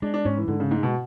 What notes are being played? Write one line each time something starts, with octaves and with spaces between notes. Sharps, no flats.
G#3 D4
D4
G#2 C#4
E3
G#2 D3
C#3
G#2 G#3
B2